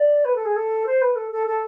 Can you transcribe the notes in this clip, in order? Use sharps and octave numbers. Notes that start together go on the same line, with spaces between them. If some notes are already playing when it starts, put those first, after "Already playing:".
Already playing: D5
B4
A4
G#4
A4
C5
B4
A4
A4
A4